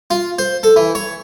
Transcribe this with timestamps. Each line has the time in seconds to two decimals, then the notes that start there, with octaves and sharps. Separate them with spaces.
0.11 F4
0.39 C5
0.63 A4
0.76 E3
0.95 C#5